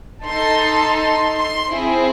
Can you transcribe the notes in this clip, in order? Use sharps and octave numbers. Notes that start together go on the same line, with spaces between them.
D#4 A4 C6
C6
C6
C4 E4 G#4